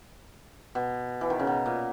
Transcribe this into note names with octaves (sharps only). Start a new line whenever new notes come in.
B2
E3
D#3
C#3
B2
A#2